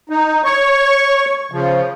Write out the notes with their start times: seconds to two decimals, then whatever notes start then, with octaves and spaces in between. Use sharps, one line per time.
0.10 D#4
0.44 C#5 C#6
1.52 C#3 F3